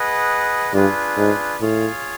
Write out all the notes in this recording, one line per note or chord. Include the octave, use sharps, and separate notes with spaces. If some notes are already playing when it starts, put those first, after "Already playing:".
Already playing: G#4 B4 D#5 F#5
G2 D4 F4 G#4 B4
G#2
A2 F4 G#4 C#5 F5